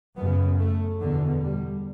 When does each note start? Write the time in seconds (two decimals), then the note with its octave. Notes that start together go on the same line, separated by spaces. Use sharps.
0.17 F#2 C#3 B3
0.59 A3
1.01 E2 B2 D3
1.43 G3